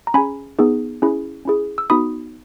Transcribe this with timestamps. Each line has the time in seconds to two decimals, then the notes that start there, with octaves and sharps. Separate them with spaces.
0.07 A#5
0.14 C#4 G#4 G#5 B5
0.59 B3 D#4 G#4
1.02 C#4 E4 G#4
1.45 C#4 E4 G#4
1.78 E6
1.90 B3 D#4 F#4 B5 D#6